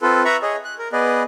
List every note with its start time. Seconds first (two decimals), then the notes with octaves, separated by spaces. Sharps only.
0.02 C4 F4 A4 B4
0.25 B4 E5 A#5 B5 C#6
0.42 G#4 C#5 D#5
0.65 F#6
0.78 A#4
0.93 B3 G#4 B4 D5 D#5